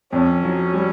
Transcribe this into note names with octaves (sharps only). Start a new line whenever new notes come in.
F2 C#4
F#3
G3